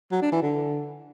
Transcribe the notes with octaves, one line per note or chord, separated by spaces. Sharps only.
F#3
D4
E3
D3